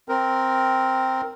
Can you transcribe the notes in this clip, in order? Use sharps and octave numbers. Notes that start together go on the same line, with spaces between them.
C4 A#4